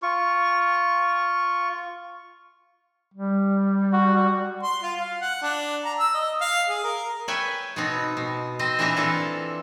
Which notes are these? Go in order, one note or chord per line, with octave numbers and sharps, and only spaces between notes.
F4 C#6
G3
F#4
C6
F4
F5
F#5
D4
A#5
E6
D#5
F5
G#4
A#4
B4 C#5 E5 G5 G#5
B2 B3 C4 D#4
B2
C4 C5 D#5
A#2 E3 C4 D4 E5 A#5
E3 F4 A4